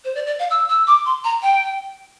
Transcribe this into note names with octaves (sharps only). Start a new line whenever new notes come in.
C5
D5
D5
F5
E6
E6
D6
C6
A#5
G5